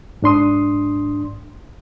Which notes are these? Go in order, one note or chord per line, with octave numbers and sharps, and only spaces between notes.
G#2 D4 C6 D#6